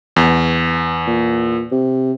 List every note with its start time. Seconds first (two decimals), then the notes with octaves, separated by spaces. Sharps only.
0.16 E2
1.07 A#2
1.71 C3